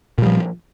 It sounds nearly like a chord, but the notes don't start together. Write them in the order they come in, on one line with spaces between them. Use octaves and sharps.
A#2 G3 F3